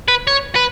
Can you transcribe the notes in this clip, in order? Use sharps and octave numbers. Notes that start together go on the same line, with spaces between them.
B4
C#5
B4